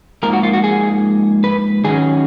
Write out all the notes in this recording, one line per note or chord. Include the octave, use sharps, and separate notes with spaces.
G#2 F3 A#3 A#4
F#4
F4
F#4
G#4
B4
D#3 F#3 C#4 G#4